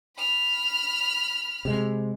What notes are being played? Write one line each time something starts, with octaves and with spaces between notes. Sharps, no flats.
B5 F6
C3 G#3